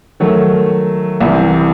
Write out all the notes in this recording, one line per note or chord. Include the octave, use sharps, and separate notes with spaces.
D#3 F#3 A3
C2 C3 E3